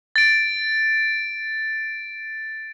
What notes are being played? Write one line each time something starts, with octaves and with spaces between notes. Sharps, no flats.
A6 D7